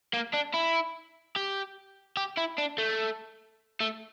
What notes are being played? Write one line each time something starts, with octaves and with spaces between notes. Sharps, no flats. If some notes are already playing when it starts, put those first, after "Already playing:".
A#3
D4
E4
G4
G4
E4
D4
A3
A3